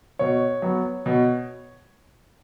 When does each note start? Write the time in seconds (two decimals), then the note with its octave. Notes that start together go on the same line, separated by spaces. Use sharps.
0.19 B2 C#5
0.62 F#3 B3
1.06 B2